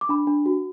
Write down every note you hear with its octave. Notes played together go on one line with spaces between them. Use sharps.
D6
D4 B5
D4
F#4